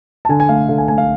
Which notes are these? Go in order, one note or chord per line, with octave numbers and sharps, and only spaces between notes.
A5
D3 G#5
G#5
A3 F5
D3 F5
G#5
A3 G#5
F5